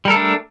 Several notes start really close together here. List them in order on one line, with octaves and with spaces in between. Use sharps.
G3 A#4 A4 A3 D4